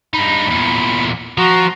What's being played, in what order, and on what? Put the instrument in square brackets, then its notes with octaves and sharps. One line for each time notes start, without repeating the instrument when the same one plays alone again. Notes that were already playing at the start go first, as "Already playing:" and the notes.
[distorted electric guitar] G2 D#4 [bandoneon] B5
[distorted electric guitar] E2 A#2
[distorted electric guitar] F3 [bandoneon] F#4 A#5